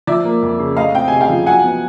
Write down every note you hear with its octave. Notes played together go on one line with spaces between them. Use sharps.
F3 D5 E5
A#3
F2
C#3
A3 D#5 F5
C4 G5
C3 G#5
F5 G5
F3
F#3 F#5 G#5
B3